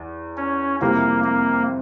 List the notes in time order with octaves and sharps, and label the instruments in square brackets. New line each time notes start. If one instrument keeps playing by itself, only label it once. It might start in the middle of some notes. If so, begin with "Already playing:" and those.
Already playing: [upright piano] E2
[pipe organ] C#4
[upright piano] F2 C3 G3 C4 E4 [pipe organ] A#3
[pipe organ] A#3